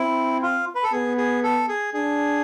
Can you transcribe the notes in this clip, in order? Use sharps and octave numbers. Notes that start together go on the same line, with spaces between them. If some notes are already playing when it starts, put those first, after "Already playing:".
Already playing: C4 E4
F4
B4
A4
B3 G#4
G#4
A4
G#4
D4 G#4